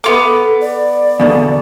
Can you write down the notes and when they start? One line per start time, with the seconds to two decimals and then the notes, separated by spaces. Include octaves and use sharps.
0.04 B3 F4 A4 D6
0.61 D5
1.20 E2 B2 D3